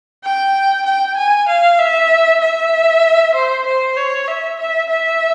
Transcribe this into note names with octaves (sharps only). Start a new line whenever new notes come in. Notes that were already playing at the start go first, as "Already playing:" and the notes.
G5
G5
G#5
F5
E5
E5
C5
C5
C#5
E5
E5
E5